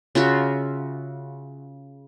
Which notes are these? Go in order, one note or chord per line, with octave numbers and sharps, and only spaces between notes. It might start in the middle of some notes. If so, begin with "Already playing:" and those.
C#3 F4 F#4 E5